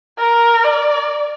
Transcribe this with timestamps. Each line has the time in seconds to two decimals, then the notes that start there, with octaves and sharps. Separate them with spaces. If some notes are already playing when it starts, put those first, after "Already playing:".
0.19 A#4
0.64 D5